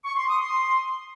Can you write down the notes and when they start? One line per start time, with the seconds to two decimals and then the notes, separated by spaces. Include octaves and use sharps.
0.05 C#6
0.17 C6
0.29 D#6
0.41 C6